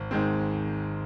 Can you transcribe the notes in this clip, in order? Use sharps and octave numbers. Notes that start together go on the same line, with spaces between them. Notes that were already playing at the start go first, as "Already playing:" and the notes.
Already playing: G#1
G#2 D#3 G#3 C4